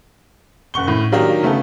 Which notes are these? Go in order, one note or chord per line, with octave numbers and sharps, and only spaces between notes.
F#1 F#5 C#6 G7
A2
D#3 F#3 A#3 D4 D#4 G4
C#3 A3 B3 A4